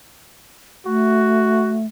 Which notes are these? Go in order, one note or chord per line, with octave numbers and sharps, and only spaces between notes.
A3 F#4